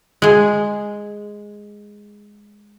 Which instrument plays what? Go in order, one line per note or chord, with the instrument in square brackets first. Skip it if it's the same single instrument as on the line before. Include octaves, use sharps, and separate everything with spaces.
[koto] G#3 G#4